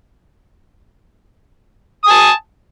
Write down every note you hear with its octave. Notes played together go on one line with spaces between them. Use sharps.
G#5 A5 D#6